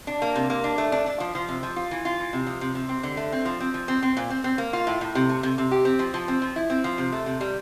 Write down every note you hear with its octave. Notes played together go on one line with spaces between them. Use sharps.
D4
A#3
C3
A#3
D4
A3
D4
D4
F3
F3
C3
F3
F4
E3
F4
E3
C3
F3
C3
C3
C4
D3
A3
C4
F3
C4
F3
C4
C4
A#2
C4
C4
A#3
F4
A2
A2
C3
A3
C3
C3
G4
C4
F3
F3
C4
F3
E4
C4
F3
C3
A3
C3
G3